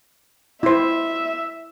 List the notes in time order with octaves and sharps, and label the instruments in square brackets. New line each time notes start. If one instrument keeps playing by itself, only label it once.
[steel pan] E4 C5 [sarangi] E5